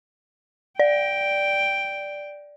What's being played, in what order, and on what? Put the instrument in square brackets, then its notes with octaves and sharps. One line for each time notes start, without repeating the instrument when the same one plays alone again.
[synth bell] D5 [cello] G5